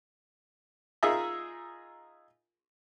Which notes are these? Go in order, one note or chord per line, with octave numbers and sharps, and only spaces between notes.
D#4 F4 G#4 A#4 D#5 E5